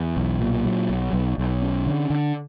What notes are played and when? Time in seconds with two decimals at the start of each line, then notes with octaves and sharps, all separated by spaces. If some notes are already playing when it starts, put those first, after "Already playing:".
Already playing: E2
0.17 B1
0.40 A#2
0.65 F#3
0.90 B1
1.13 B1
1.38 B1
1.62 C#4
1.87 D3
2.10 D3